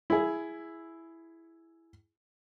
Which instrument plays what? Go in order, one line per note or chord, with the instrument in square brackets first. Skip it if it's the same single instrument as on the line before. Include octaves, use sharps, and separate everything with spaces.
[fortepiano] E4 G#4